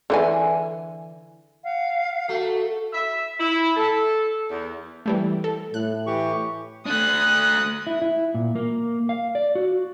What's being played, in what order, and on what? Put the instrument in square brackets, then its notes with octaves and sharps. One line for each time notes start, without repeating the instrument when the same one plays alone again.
[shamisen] D3 E3 G#5
[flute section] F5 F#5
[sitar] A3 [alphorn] F#4
[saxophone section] E5
E4
A4
E2
[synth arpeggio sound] E3 G3 A3
A4
[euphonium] A2 [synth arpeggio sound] F#6
[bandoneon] E3 G4 C#6
[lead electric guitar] A3 D4 [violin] D#6 F#6
[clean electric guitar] E4
E4
A#2
A#3
F5
D5
F#4